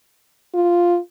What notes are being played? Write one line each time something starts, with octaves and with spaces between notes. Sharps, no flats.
F4